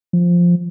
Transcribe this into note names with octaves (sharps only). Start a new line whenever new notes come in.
F3